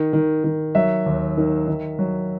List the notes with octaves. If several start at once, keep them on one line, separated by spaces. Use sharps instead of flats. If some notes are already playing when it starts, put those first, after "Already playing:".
Already playing: D#3
D#3
D#3
F#3 E5
D#2
D#3
D#3
F#3